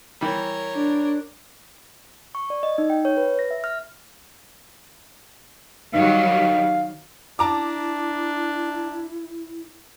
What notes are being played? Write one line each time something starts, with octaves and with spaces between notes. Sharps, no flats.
E3 G3 A#4 C#5
D4
C#6
D5
D#5
D#4
G5
C#5
B4
A#6
E5
F6
D#3 F#3 G3 F5
D4 E4 A5 A#5 D6